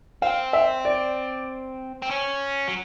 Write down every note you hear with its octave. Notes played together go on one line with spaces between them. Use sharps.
C4 F5
E5
D5
C4
C#4
F#3